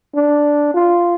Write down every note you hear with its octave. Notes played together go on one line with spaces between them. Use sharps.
D4
F4